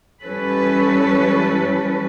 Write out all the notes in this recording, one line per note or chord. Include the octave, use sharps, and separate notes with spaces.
E3 G3 C#4 A4 B4